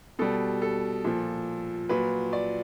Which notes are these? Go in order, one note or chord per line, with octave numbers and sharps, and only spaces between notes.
B2 G3 A4
A4
A#2 F3
A#2 F#3 B4
D5